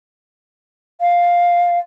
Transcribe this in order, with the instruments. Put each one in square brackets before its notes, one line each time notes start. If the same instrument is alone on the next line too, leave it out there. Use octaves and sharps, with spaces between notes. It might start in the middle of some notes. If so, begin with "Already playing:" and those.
[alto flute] F5